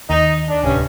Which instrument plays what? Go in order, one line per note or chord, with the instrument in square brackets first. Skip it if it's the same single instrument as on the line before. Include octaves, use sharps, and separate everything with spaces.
[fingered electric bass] D#2 [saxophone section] D#4
[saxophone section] D4
[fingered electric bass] D1 C2 [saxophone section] G2 C#4